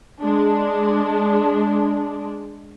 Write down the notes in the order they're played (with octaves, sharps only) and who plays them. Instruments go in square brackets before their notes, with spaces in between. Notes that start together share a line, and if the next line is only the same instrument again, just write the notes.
[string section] G#3 D4